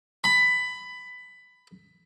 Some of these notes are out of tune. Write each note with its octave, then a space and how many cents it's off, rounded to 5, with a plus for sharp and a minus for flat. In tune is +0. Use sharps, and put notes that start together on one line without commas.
B5 +15